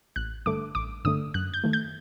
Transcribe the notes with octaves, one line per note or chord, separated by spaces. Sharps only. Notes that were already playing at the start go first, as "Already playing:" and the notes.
A1 F#6
G2 D3 A3 D6
A1 D6
G2 D3 A3 D#6
F#2 F#6
G6
D#3 A3
G6